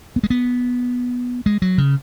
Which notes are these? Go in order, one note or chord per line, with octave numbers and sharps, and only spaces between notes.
B3
G#3
B3
G#3
F#3
C#3